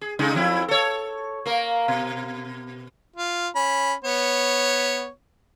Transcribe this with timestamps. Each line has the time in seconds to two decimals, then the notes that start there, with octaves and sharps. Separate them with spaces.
0.01 G#4
0.19 C#3 G#3 D#4
0.35 F2 F3 E4
0.68 A4 C#5
1.46 A#3 A#4
1.88 B2
3.16 F4
3.56 C#4 B5
4.04 B3 C#5